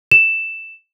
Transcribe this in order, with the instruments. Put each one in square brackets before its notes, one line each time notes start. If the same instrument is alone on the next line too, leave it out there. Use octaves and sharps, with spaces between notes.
[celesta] E7